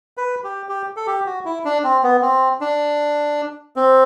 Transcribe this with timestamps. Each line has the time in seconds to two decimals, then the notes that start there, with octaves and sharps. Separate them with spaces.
0.17 B4
0.44 G4
0.69 G4
0.97 A4
1.07 G4
1.26 F#4
1.45 E4
1.65 D4
1.84 C4
2.03 B3
2.22 C4
2.61 D4
3.76 C4